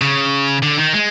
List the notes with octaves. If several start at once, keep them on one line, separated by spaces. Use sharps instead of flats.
C#3
D3
D#3
G#3